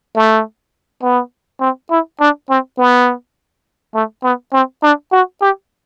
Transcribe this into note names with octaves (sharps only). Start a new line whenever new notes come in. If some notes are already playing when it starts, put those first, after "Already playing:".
A3
B3
C4
E4
D4
C4
B3
A3
B3
C4
D4
F#4
G4